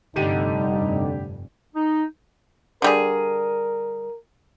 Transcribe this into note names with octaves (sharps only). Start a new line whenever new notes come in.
F1 G2 D3 G3 D#4 G4 D#7
D#4
D3 G3 G#4 A#4